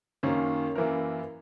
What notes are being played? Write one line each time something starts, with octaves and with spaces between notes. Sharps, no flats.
F#2 D#3 A#3 C#4
F#2 E3 A#3 E4 A#4